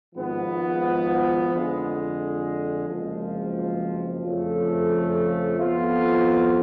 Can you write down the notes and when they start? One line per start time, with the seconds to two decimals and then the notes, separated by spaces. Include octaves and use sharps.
0.15 G#1 G#2 F3 B3
1.50 F2 D3 G#3
2.86 F#1 F2 F3 G#3
4.23 F2 C#3 F3 A3
5.58 F2 F3 B3 F4